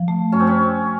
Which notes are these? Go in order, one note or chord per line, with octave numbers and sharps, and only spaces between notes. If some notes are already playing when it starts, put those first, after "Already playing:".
Already playing: F3
A3
F#2 C#4
C4
C#4